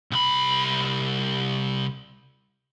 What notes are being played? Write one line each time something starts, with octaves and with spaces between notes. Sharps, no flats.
C2 B5